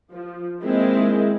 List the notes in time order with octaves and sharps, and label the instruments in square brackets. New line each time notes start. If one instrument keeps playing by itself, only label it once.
[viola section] F3
D#3 G#3 A#3 C4 E4